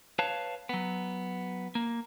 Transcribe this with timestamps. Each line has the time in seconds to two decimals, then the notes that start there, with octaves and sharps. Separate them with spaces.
0.19 B4 C#5 F5 A5
0.69 F#3 B3
1.75 A#3